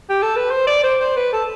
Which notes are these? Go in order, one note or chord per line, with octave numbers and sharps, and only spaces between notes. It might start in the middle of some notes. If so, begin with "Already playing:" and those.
G4
A4
B4
C5
D5
C5
C5
B4
A4